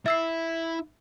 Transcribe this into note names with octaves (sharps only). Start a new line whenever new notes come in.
E4 E5 E6 C7